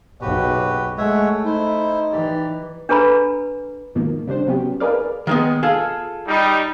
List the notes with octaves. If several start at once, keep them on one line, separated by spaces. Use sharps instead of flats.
F#1 B1 F#4 G4 B4
G#3 A3 C#5 E5 F#5
D#4 E4 C5
E3 G4 D5
D4 G#4 A4 B4 A#5 B5
G#2 B2 D#3 F3 A#3
C#3 G3 D4 C5
C3 F#3 B3 C#4 G4
D#4 G#4 A#4 B4 D5 F5
D#3 G#3 B3
F4 G#4 A4
G3 D#4